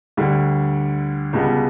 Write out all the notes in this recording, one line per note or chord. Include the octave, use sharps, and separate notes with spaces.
D2 D3 G3
C#2 B2 G3 B3